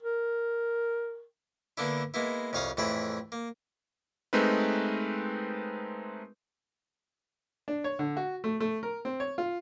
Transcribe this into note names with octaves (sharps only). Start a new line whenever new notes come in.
A#4
D3 A#3 B3 D4 E4
G#3 A#3 B3 E4
C2 F2 C#5 F5 D#6
F2 A2 E3 G#4 G5 B5
A#3
G#3 A3 C4 D#4 A#4 B4
D4
C#5
D3
F#4
A3
A3
A#4
C4
C#5
F4